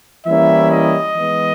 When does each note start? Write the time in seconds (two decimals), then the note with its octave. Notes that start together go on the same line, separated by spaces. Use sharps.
0.26 E3 G3 A#3 C#4 E4 E5
0.71 D#5
1.16 E3 G#3 B3